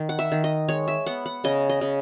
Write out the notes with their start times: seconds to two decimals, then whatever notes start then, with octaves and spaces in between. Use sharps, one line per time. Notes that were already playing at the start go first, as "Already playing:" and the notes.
Already playing: D#3
0.09 F#5
0.19 E5
0.32 D#3
0.44 D#5
0.69 G#3 C#5
0.88 E5
1.06 B3 F#5
1.26 F#5
1.44 C#3 D#5
1.69 D#5
1.81 C#3